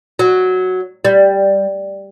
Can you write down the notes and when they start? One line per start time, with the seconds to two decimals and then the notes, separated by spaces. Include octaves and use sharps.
0.19 F#3
1.05 G3